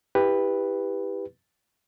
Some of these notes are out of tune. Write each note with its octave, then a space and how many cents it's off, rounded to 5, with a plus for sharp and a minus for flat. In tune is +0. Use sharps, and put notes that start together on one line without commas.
E4 -10 G4 +15 B4 +0